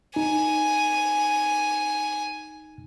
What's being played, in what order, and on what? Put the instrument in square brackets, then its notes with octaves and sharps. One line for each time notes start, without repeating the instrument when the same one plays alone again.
[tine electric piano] D#4 [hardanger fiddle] G#5